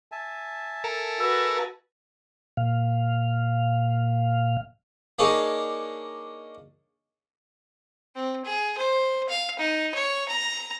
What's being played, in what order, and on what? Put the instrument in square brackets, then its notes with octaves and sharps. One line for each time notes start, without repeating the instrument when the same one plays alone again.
[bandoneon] E5 G#5 A5
[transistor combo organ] A4 A#4
[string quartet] F#4 B4 [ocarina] E6
[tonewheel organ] A#2 F5
[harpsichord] A#3 D4 D#4 G#4 C#5
[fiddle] C4
G#4
C5
F5
D#4
C#5
A#5